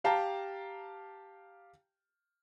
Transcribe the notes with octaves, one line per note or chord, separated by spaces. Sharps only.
G4 F5 G5 A5 A#5